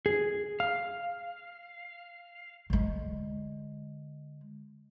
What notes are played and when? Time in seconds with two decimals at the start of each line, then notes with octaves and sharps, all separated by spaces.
0.06 G#4
0.60 F5
2.70 D3 G#3